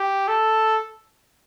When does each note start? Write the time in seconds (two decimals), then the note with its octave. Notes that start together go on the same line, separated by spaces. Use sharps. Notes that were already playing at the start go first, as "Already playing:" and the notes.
Already playing: G4
0.28 A4